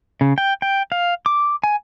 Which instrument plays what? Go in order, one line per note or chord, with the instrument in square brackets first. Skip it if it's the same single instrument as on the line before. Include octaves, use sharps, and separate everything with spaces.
[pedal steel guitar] C#3
G5
G5
F5
D6
G#5